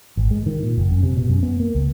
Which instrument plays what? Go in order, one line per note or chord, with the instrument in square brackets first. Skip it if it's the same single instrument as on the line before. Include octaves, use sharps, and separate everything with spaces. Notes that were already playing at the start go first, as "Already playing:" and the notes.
[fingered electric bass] G#1
G#3
D#3
A#2
F#1
F#2
C3
B2
F#2
B3
A#3
C#2